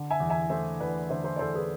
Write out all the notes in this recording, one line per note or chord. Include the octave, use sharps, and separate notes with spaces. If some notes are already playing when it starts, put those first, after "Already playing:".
Already playing: D3
E5 G#5
E2
E5 G#5
A3 C5 E5
E2 B4 D5
D3 C5 E5
C5 E5
D5
E2 A4 C5
G#4 B4